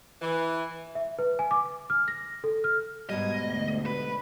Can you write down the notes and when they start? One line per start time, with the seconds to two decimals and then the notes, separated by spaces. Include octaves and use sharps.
0.21 E3
0.95 E5
1.19 B4
1.39 G#5
1.51 D6
1.90 F6
2.08 A#6
2.44 A4
2.64 F6
3.09 G#2 B2 G3 D#5 G#6
3.43 D2
3.86 B4